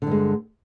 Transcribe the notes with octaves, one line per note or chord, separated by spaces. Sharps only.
G2 D3 G#3